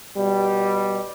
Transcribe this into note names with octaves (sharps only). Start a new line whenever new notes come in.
B2 G3